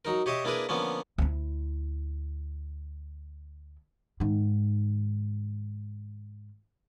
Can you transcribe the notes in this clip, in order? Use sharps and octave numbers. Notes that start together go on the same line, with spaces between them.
F#3 D#4 A#4
G4 C#5 D#5 E5 D6
A#3 D4 E4 G#4 A#4 B4
D3 F3 A#3 B3 C#4
D2 E4
G#2 D#3